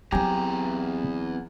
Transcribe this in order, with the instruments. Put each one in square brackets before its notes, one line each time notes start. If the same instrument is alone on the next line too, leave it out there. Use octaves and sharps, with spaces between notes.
[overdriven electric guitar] E2 A#5 [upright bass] F#3 C4 [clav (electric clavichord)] G4 G5 G#5